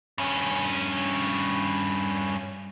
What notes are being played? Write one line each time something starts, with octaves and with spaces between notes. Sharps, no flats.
G2 C#4